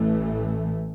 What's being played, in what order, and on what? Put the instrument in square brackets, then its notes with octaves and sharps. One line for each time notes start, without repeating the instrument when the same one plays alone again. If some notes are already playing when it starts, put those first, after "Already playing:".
Already playing: [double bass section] A1 A2 E3 A3